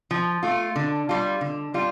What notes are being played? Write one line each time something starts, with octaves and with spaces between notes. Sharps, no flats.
F3
A3 F4
D3
G3 F4
D3
G3 F4